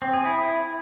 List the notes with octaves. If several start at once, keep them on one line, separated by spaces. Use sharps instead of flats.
C4
G#4
E4